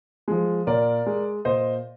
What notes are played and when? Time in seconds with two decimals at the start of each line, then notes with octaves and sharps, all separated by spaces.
0.28 F3 G#3
0.67 A#2 A#4 D5
1.06 G#3
1.45 A#2 C5 D#5